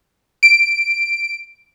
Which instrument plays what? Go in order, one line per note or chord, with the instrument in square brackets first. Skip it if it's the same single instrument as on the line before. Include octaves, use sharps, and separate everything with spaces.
[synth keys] D7